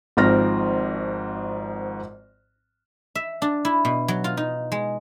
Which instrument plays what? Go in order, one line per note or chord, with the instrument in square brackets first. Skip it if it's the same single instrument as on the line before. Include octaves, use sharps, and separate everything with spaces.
[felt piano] G#1 G#2 F3 C4 F6 A#6
[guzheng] E5
D4
E4
B2
F#3
F4
D#4
G#3